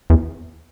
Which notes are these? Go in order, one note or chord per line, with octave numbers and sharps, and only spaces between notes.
E2